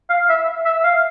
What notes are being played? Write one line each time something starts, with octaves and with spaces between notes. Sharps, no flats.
F5
E5
E5
F5